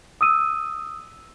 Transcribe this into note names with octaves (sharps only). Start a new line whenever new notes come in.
D#6 E6 D#7